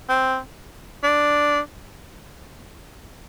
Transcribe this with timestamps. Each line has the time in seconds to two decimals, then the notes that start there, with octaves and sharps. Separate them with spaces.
0.09 C4
1.03 D4